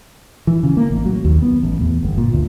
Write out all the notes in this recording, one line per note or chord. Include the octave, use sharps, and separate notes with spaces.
E3
C#3
A#3
A1
F#3
D#2
B3
A1
E2
G1
A#2
D2